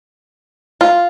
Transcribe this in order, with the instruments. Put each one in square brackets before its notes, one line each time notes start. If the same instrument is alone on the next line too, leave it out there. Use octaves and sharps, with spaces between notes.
[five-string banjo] F4